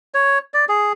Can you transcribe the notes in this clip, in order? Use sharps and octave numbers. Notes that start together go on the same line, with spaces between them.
C#5
D5
G#4